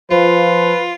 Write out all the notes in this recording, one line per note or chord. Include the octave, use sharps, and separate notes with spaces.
F3 F4 B4 C5